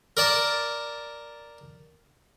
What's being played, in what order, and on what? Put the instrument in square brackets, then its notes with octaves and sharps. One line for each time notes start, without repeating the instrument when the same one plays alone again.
[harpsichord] A#4 D5 A5